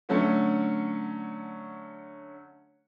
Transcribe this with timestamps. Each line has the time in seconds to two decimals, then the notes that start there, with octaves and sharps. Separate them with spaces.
0.09 D3 F#3 A3 C#4